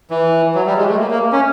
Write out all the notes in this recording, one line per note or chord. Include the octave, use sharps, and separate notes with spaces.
E3
F#3
G3
G#3
A3
A#3
A#3
C#4